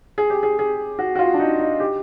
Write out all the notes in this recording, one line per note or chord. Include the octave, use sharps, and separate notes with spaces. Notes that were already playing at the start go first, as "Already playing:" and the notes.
G#4
G4
G#4
G#4
F#4
F#4
F4
D4
D#4
D#4
G4